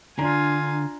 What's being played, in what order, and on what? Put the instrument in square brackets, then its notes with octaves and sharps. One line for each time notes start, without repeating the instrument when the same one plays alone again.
[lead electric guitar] D3 [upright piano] D4 A#5 [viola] F4 G#5